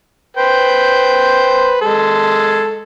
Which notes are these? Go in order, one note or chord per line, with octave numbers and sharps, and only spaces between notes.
B4 C5 G5
G#3 A4